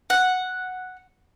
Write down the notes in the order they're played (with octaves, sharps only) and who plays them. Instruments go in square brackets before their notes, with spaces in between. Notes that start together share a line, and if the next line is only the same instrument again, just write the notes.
[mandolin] F#5